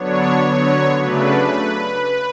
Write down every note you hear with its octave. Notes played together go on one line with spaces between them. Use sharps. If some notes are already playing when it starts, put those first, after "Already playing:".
Already playing: D3 F#3 B3 D4 C#5
D3 F#3 B3 C#5
C#3 F#3 A3 D4 B4